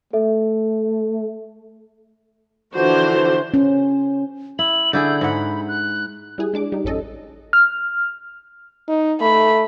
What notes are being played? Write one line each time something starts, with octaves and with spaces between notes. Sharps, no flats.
A3 A4 E5
D3 E3 F3 D4 F#4 C5
C#4
E4 F#7
D3 E4 G#4 G6
G#2 F#5 B5
F#6
G3 E4 G#4
G#3 D4 D6
G3 D#4
A1 F#2 C#4 A4 D#5
F6
D#4
A3 B5